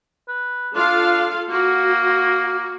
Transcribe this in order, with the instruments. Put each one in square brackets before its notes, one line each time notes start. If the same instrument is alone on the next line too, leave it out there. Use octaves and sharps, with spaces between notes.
[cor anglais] B4
[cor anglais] D4 [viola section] F4 A4 F5
[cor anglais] A#3 [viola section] F#4